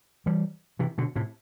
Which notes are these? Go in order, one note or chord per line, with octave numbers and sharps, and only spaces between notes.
E3 G3
C3 E3
B2 D3
A2 C3